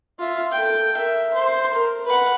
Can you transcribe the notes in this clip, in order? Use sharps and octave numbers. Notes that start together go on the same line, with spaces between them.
F4 E5
A4 G5
A#4 E5
C5
A#4
B4 F#5